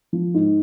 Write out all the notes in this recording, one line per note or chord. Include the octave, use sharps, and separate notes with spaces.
F3
G#2